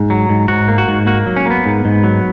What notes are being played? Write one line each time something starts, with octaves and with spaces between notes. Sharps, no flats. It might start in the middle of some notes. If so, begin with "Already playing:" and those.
Already playing: G#2
F#3
G#2
G#2 F#4
A#3
F#4
G#2
A#3 F#4
F#3
C#4
A#3 B3
G#2
G#2
F#3